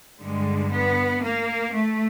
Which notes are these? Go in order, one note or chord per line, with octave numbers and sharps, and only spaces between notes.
G2 D3 G3 G#3
B3
A#3
A3